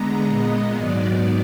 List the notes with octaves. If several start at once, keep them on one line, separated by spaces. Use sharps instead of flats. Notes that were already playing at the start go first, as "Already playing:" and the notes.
Already playing: D3 G#3 B3 A#5
A#2 G#3 B3 D#5
G#2 D#3 F#3 B3 D5